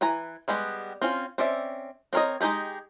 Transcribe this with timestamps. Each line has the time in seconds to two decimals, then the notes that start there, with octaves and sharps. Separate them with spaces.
0.01 E3 B4 G#5 A#5
0.48 G3 G#3 B3 G4
1.02 C4 C#4 F4
1.38 C4 C#4 D5 E5
2.13 C4 D4 A#4 C#5 D#5
2.41 G#3 D#4 G4 G#4